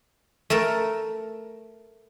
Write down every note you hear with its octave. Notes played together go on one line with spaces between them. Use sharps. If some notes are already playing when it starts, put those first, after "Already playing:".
A3 A4 A#4